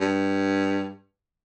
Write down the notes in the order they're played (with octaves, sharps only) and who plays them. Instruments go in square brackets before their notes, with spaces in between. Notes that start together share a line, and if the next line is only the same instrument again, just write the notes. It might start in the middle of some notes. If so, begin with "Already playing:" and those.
[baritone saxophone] G2